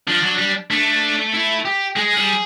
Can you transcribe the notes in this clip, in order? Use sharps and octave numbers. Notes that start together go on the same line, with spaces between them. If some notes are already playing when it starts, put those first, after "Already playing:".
F3 D4
F#3
G3
A3 D4
E4
G4
G#3 G#4
G3